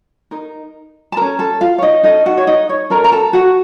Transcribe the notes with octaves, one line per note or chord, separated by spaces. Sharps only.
D#4 A#4
A5
C#4 A4 A#4 A#5
A4 A5
F4 F5
C#5
D#4 D#5
C#4 D#4 A4 D#5
F#4 F#5
C#5
D#4 D#5
C#5
C#4 A4 A#4 A#5
A#5
A4 A5
F#4 F#5